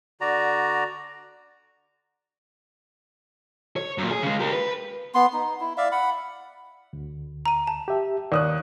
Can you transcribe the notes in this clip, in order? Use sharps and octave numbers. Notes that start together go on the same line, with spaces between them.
D3 F#4 D5 A#5
C#5
F#2 A#2
G#4
C#3 G#3
G4 A#4
B4
B3 C6
D#4
E4
D5 E5 F5
F#5 B5
D2
A#5 D#7
A5
G4 E5
D#2 C#5 D5 D#6 F#6